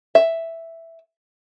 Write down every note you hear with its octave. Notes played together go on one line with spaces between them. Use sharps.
E5